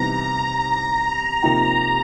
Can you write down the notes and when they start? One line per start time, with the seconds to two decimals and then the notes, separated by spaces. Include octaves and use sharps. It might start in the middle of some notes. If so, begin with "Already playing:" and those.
Already playing: C3 E3 G3 B3 D#4 A#5
0.58 A#5
1.42 C3 F3 A#3 D#4 G4